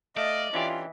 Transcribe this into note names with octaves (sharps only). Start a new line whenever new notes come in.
A3 D5 D#5 F5
E3 C#4 D4 F4 G4